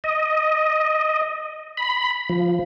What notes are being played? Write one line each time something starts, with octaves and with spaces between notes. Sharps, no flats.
D#5
B5
F3